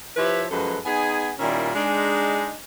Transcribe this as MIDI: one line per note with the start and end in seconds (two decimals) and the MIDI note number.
0.17 0.44 53
0.17 0.44 64
0.17 0.44 67
0.17 0.44 71
0.17 0.44 73
0.17 0.44 76
0.51 0.78 42
0.51 0.78 53
0.51 0.78 56
0.51 0.78 69
0.51 0.78 71
0.85 1.31 59
0.85 1.31 63
0.85 1.31 68
0.85 1.31 80
1.39 1.70 46
1.39 1.70 51
1.39 1.70 55
1.39 1.70 61
1.39 1.70 64
1.39 1.70 65
1.75 2.55 56
1.75 2.55 62
1.75 2.55 63